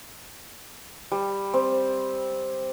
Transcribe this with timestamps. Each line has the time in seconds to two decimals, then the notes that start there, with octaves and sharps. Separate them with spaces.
1.12 G3
1.54 C4